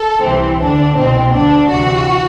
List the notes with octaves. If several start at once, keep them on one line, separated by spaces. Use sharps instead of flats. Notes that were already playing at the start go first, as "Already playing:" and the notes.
Already playing: A4
C2 C3 E3 C4
D2 D3 D4
C2 B2 C4
D2 D3 D4
D2 C3 E3 F#4